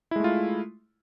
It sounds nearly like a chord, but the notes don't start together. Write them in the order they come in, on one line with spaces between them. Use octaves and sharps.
E4 G#3 A3 F4